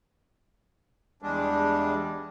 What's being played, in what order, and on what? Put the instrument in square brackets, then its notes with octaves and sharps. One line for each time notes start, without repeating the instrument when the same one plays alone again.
[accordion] E2 G3 G#3 D4